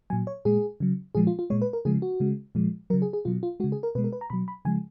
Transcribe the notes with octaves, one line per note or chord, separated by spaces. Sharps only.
A#2 F#3 G#5
C#5
A#2 G#3 G#4
C#3 F#3
A#2 F3 G#3 G#4
F4
F4
A#2 G#3 C#5
B4
A#4
C#3 F3 G#3 G#4
F#4
C#3 G#3
A#2 F3 G#3
C#3 F#3 A#4
G#4
G#4
B2 F#3 F4
F4
C#3 G#3 F#4
G#4
A#4
B2 G#3 B4
A#4
B4
A#5
B2 F#3 B5
B5
C#3 F3 G#3 G#5